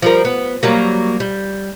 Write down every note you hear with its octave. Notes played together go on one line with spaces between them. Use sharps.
F3 G3 A#4
B3
F#3 G3 A#3
G3